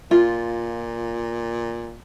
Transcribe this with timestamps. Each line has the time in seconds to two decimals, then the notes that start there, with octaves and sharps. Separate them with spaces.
0.11 A#2 F4